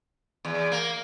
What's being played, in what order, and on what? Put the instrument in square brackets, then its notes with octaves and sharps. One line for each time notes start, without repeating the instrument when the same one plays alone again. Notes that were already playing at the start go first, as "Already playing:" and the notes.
[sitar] E2
A#3